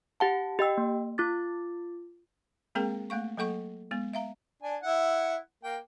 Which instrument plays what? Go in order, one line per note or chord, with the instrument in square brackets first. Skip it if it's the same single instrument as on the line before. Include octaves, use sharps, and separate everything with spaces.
[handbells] G4 F#5 A5
G4 D#5 G5 E6
A#3
F4 D6 A6
[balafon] G#3 A#3 C4 G#4 A#4 G5
A3 A#3 F5 C#6
F#3 A#3 A4 F#5 C#6
G#3 B3
E5 F5 A#5
[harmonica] D4 G#5
E4 F#5
A#3 G5